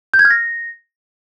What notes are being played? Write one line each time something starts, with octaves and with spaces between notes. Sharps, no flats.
G6
G#6
F6
A#6